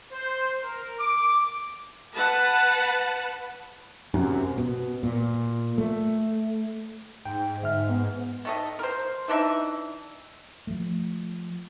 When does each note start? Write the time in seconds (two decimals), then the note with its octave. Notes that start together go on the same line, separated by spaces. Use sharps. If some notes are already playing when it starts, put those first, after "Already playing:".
0.12 C5
0.63 A#4
0.98 D6
2.15 B4 F#5 A5
4.14 F#2 C3
4.58 B2
5.03 A#2
5.78 A3
7.25 G#2 G5
7.62 G1 E5 F6
7.90 B3
8.45 D#3 A3 D#5
8.79 A#4 C5
9.28 E3 D4 D#4 E5
10.67 F3 A3